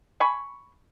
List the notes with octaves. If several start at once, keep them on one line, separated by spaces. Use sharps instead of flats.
G#5 B5 C#6